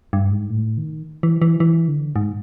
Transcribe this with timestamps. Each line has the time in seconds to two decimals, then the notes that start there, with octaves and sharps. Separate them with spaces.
0.13 G2
0.31 G#2
0.50 A2
0.78 D#3
1.23 E3
1.42 E3
1.60 E3
1.88 D3
2.16 G#2